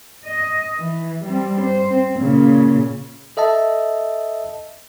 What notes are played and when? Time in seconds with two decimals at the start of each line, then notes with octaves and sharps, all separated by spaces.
0.25 D#5
0.78 E3
1.25 G3 C4
1.62 C5
1.90 C4
2.20 A#2 C#3
3.37 A4 D#5 E5 A5